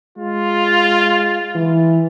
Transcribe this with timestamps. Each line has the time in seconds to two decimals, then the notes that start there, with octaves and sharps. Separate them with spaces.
0.18 G#3 F4
1.55 E3